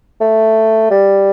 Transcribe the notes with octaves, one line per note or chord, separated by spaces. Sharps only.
A3
G3